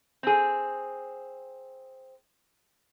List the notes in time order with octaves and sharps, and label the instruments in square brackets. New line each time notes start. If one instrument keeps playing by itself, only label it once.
[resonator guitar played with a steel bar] C4 G#4